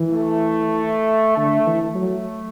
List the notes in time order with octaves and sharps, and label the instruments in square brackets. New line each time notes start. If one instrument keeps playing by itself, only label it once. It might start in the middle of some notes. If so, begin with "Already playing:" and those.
Already playing: [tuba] E3
[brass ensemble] A3
[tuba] D3 [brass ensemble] A3
[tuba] E3
[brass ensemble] A3
[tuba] F#3